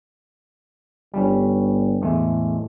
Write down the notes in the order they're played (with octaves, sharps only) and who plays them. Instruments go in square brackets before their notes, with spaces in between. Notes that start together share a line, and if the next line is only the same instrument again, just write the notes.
[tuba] G1 [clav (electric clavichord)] G3 C#4
[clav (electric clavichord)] E2 G#3 A3 [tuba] A2